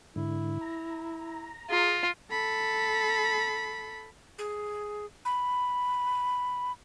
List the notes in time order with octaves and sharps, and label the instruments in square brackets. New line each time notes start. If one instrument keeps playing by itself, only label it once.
[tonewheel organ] G#2 D3 [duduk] E4
[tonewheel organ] A#5
[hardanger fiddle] F4 [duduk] G#4
[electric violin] A4 B5
[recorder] G#4
B5